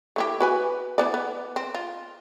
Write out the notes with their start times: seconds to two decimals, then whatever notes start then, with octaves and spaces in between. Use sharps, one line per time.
0.16 A3 E4 G4
0.40 F#4 B4 G#5
0.98 E3 B3 D5
1.14 B3
1.56 C4
1.74 F4